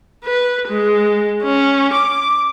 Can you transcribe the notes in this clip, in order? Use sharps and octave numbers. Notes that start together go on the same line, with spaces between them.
B4
G#3
C#4
D6